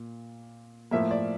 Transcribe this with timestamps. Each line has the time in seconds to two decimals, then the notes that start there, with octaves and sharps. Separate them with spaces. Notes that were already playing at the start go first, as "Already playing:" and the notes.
Already playing: A#2
0.91 A2 F3 A#3 E5
1.11 D5